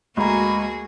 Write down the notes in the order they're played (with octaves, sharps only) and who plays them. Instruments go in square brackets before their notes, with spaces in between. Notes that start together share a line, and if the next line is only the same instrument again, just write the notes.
[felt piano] D2 A#5 [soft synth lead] G#3 [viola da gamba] A#3 F#4 G#4 [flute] B5